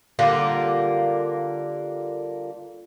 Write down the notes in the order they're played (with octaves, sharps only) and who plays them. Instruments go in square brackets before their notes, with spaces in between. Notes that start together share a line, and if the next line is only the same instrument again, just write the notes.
[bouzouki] D3 G3 A#3 F4